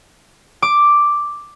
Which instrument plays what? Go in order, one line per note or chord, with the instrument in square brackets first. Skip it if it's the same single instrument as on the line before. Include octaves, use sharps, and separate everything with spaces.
[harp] D6